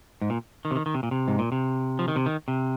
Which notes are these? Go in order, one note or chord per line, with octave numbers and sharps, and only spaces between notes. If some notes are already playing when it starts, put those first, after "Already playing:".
G#2
A#2
D#3
C3
D#3
D#3
C3
A#2
C3
G#2
A#2
C3
F3
D#3
C3
D#3
C3